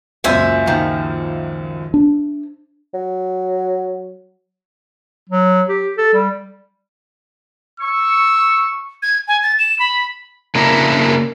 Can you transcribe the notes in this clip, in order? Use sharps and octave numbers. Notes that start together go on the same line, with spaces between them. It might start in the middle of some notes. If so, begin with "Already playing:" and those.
C#2 F#2 A#2 C5 E5 G#5
D#3 F3
D4
F#3
F#3
G4
A4
G3
C#6 E6
G#6
G#5
A6
E7
B5
C#3 A#3 D4 E4 A#4